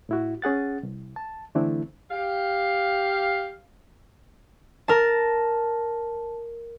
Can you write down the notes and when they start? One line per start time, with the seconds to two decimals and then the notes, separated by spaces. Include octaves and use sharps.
0.09 A2 E4 F#4
0.42 C#4 G#4 F#5 A6
0.83 C2
1.16 A5
1.55 D3 E3 A3 C4 D4 E4
2.10 G4 F5
4.88 A#4 A5